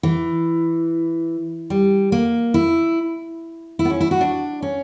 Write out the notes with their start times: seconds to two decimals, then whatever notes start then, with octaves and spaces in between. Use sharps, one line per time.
0.03 E3
1.70 G3
2.12 A#3
2.54 E4
3.79 E4
3.85 B3
3.90 C#4
4.00 E4
4.11 F#4
4.21 D4
4.62 C#4